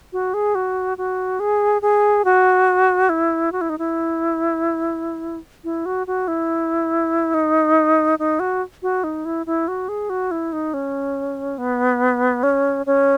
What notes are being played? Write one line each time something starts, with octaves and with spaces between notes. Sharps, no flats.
F#4
G#4
F#4
F#4
G#4
G#4
F#4
E4
F#4
E4
D#4
E4
E4
F#4
F#4
E4
D#4
D#4
F#4
F#4
D#4
E4
E4
F#4
G#4
F#4
E4
D#4
C#4
B3
C#4
C#4